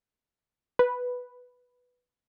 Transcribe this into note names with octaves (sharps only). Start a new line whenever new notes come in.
B4